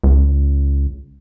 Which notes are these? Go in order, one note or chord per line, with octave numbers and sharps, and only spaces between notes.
C#2